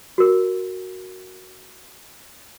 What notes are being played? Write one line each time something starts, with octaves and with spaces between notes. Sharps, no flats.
F#4 A#4